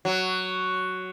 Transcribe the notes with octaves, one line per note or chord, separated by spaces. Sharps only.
F#3